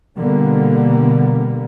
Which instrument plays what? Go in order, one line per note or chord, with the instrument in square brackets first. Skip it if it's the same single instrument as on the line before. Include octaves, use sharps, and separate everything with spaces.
[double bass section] B2 D3 G3 A#3 B3